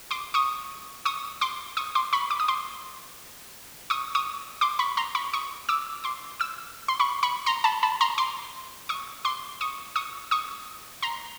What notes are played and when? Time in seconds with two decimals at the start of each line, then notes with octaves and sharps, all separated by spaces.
0.11 C6 D6
0.34 C#6 D#6
1.05 C#6 D#6
1.41 C6 D6
1.77 C#6 D#6
1.95 C6 D6
2.13 B5 C#6
2.31 D6
2.40 D#6
2.48 C6 D6
3.90 C#6 D#6
4.15 C#6 D#6
4.61 C6 D6
4.79 B5 C#6
4.97 A#5 C6
5.15 B5 C#6
5.33 C#6 D#6
5.69 D6 E6
6.04 C6 D6
6.40 D6 E6
6.88 C6
7.00 B5 C#6
7.23 B5 C#6
7.46 A#5 C6
7.64 A5 B5
7.83 A5 B5
8.01 A#5 C6
8.18 C6 D6
8.89 C#6 D#6
9.25 C6 D6
9.61 C#6 D#6
9.96 C#6 D#6
10.31 C#6 D#6
11.02 A#5 C6